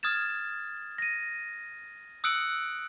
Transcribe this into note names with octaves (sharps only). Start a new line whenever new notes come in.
D#6 F6 G#6 A6 E7
A#6 D#7
D#6 E6 F#6 C#7 D7 F#7